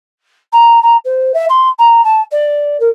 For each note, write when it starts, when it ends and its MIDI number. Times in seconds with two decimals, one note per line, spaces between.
0.52 0.81 82
0.82 0.96 82
1.05 1.32 72
1.34 1.45 76
1.49 1.68 84
1.79 2.03 82
2.04 2.21 81
2.31 2.77 74
2.80 2.89 70